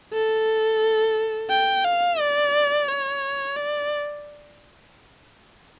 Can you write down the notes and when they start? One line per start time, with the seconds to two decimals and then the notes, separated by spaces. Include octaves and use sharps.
0.13 A4
1.50 G5
1.84 F5
2.19 D5
2.88 C#5
3.56 D5